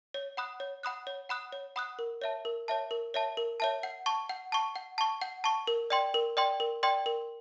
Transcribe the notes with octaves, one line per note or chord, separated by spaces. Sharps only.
C#5
F#5 B5 D#6 F#6
C#5
F#5 B5 D#6 F#6
C#5
F#5 B5 D#6 F#6
C#5
F#5 B5 D#6 F#6
A#4
C#5 E5 A5
A#4
C#5 E5 A5
A#4
C#5 E5 A5
A#4
C#5 E5 A5
F#5
A5 C#6
F#5
A5 C#6
F#5
A5 C#6
F#5
A5 C#6
A#4
D5 G5 C6
A#4
D5 G5 C6
A#4
D5 G5 C6
A#4